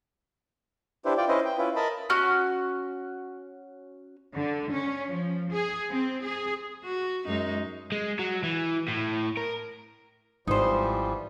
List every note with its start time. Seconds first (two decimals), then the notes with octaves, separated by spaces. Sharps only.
1.05 D4 E4 G4 B4 C5
1.17 F4 D5 G5
1.29 C#4 E4 B4 C5 D#5
1.45 G5
1.58 C#4 E4 F4 B4
1.76 A#4 D#5 A5 B5
2.10 C#4 F#4 F6
4.36 D3
4.72 C#4
5.08 F3
5.53 G#4
5.91 C4
6.26 G#4
6.84 F#4
7.27 F#2 G#3 D#4
7.92 G#3
8.19 F#3
8.43 E3
8.88 A2
9.37 A#4
10.47 G#1 E3 F3 G3 D#4 C5